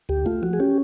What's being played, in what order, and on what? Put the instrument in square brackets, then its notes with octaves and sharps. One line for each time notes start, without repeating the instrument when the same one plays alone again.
[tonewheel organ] D2 G4
A3 F4
F3 F#4
G#4
C#4 G4